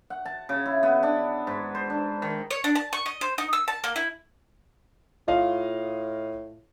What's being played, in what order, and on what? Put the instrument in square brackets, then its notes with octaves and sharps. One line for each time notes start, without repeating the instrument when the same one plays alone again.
[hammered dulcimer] F#5
A5
C#3
E4
B3
D4
G#2
C5
D4
D#3
[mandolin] C#5
D4
A5
C#6
D#5
C5
D#4
E6
A5
A#3
E4
[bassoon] A2 [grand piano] F4 D#5 F5